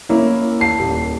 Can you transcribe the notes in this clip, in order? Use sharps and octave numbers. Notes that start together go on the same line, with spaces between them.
A#3 C#4 E4
A5 C7
D#1